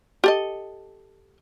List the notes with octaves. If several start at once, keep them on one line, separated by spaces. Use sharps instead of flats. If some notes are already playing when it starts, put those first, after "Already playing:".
G4 A4 D#5